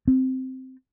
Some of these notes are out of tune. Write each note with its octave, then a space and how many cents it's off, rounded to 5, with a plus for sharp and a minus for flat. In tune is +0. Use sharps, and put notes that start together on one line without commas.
C4 -5